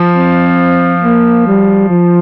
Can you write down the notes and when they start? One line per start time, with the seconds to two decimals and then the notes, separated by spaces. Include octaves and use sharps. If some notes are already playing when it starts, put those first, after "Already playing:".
Already playing: F3
0.16 C4
1.03 A#3
1.47 G3
1.90 F3